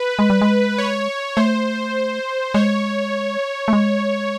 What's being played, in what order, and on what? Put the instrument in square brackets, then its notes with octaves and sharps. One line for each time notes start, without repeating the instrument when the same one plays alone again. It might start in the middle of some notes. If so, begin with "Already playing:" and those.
Already playing: [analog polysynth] B4
[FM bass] G#3
G3
G#3
[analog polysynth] C#5
[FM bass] A3 [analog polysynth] C5
[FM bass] G#3 [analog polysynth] C#5
[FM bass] A3
G#3